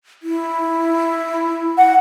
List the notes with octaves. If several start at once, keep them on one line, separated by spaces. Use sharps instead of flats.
E4
F#5